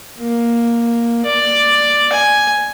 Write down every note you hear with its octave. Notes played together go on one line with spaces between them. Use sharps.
A#3
D5
G#5